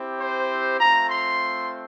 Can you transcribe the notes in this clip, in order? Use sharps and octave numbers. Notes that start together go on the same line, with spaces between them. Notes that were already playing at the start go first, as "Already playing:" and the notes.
Already playing: C4 E4 G4
C5
A3 C4 F4 A#5
C6